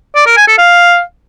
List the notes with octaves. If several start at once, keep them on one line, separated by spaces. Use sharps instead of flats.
D5
A#4
G#5
A4
F5